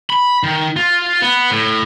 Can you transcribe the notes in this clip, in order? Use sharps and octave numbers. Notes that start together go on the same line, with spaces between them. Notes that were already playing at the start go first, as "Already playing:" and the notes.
B5
D#3
F4
B3
A2